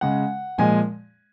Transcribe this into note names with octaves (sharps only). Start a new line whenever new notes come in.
C#3 G#3 F#5
A#2 F3 G#3 G#5